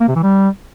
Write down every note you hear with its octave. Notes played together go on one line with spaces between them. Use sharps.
A#3
C3
E3
G3